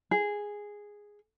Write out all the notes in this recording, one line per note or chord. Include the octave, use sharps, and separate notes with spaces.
G#4